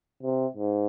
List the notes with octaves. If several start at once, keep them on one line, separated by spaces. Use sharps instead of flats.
C3
G#2